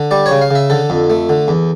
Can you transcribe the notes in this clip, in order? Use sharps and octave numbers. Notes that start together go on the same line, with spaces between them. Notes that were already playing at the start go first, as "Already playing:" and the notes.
Already playing: D3
G3 D5
C#5
C#3
F5
C#3 E5
D3 A4
F2
A3
D3
E2